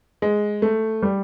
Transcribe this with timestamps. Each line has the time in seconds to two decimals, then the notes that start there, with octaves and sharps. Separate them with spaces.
0.22 G#3
0.62 A3
1.02 G3